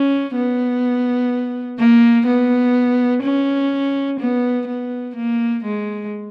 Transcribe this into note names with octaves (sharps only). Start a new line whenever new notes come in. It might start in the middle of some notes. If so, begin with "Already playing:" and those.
Already playing: C#4
B3
A#3
B3
C#4
B3
B3
A#3
G#3